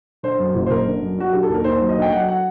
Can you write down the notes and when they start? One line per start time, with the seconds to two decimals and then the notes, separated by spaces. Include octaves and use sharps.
0.23 D3 C5
0.39 F#2
0.55 F#1
0.66 C5
0.70 F#1 A#4
0.86 D3
1.01 F#2
1.18 F#3 F#4
1.32 D3 G4
1.43 A4
1.49 D#2 A#4
1.64 D#2 C5
1.81 F#3
1.89 D#5
1.97 D3
2.02 G5
2.12 F#3 F#5
2.28 F#5